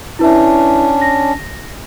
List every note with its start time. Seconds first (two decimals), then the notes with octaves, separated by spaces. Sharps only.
0.19 C#4 D4 E4 B4 E5
1.01 A#6